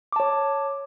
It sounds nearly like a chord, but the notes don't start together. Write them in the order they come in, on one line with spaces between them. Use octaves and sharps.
D6 A5 C#5